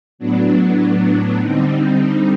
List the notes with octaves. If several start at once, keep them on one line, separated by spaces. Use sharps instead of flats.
A2 F#3 B3 D4
D3 G3 C4 D#4